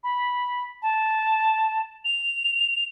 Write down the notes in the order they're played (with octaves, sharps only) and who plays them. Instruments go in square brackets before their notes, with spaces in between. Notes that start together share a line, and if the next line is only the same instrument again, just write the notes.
[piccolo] B5
A5
F7